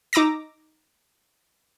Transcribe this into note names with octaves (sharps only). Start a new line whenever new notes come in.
D#4 A#5 D6 E6 A#6